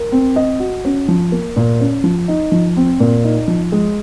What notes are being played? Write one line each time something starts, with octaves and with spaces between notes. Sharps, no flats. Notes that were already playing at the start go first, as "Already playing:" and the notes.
Already playing: A#4
C4
D#5
F#4
C#4
F3
A#3
A#2
C#4
F3
D#4
F3
C4
A#2
D#4
F3
G#3